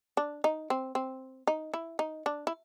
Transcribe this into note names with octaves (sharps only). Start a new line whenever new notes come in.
D4
D#4
C4
C4
D#4
E4
D#4
D4
E4